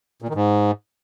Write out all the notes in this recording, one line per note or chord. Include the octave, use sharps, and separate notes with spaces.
A#2
D#3
G#2